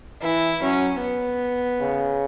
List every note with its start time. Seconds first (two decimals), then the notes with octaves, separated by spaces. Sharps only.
0.22 E3 E4
0.62 F#3 C#4
1.02 B3
1.81 C#3